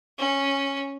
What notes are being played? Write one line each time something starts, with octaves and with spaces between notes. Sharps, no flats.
C#4